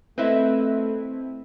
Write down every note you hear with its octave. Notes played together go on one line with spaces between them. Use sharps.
A3 C4 E4 B4 D#5 E5